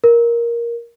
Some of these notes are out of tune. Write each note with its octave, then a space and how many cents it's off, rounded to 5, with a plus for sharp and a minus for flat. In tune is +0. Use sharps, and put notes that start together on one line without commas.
A#4 +10